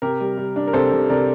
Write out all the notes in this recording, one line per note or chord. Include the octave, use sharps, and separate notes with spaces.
C3 G4 A#4
G3
G3
D4
A#4
C3 A4 C5
C3
C3 A#4 D5